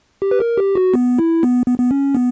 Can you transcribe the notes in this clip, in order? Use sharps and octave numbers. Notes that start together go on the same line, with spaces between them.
G4
B4
A#4
G4
F#4
B3
E4
B3
B3
B3
C#4
B3